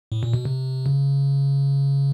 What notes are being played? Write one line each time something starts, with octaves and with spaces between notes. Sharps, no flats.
A2
A#2
B2
C3
C#3